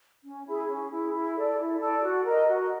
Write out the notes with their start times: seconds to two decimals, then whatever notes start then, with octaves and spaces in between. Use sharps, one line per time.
0.24 C#4
0.47 E4 G#4
0.68 C#4
0.91 E4 G#4
1.14 E4
1.35 A4 D5
1.58 E4
1.80 A4 D5
2.03 F#4
2.25 A#4 D#5
2.47 F#4